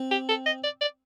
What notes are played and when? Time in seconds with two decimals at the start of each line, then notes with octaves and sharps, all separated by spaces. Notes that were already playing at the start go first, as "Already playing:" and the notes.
Already playing: C4
0.11 G4
0.29 A4
0.46 D#5
0.64 D5
0.81 D5